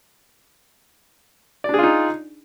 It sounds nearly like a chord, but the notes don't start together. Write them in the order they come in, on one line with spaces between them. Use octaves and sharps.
D5 D4 G#4 F4 D#4